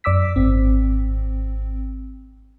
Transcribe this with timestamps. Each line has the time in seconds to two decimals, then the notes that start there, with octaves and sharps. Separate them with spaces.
0.04 F#2 D5 D6 E6 B6
0.36 G#1 C4